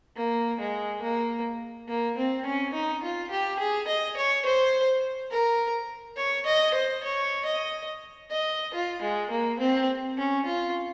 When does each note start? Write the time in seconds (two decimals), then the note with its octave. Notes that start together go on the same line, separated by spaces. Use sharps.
0.17 A#3
0.60 G#3
1.02 A#3
1.88 A#3
2.17 C4
2.46 C#4
2.73 D#4
3.03 F4
3.31 G4
3.59 G#4
3.88 D#5
4.17 C#5
4.45 C5
5.31 A#4
6.17 C#5
6.46 D#5
6.74 C5
7.03 C#5
7.46 D#5
8.31 D#5
8.74 F4
9.02 G#3
9.31 A#3
9.59 C4
10.18 C#4
10.45 F4